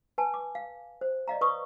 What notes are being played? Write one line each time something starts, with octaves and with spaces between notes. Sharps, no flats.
B4 G#5 A5
D6
F5
C5
D5 D#5 F5 A#5
B4 C#6 D#6